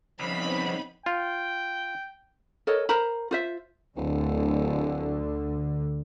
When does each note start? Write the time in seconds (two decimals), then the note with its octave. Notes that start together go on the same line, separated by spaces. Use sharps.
0.20 C2 C#3 F3 B3 C4 D#4 B5
1.06 F4 G5
2.67 A4 A#4 C#5 D#5
2.89 A#4 C5 A#5 B5
3.31 F4 C5 E5
3.96 D1 D2 D3